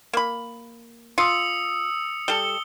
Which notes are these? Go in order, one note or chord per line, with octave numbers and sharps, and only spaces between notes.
A#3 B5
F4 D#6 E6 C#7
G3 A4 G7